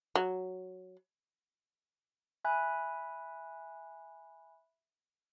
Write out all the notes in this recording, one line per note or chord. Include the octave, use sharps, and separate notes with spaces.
F#3
E5 G#5 B5 F#6